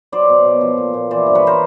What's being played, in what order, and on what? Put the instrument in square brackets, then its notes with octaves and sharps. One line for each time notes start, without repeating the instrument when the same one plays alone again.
[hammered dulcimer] F#3 C5 D5
B2
B2
F3
A#2
A#2
E3 C5 D5
G2
B4 C#5
A#4 C5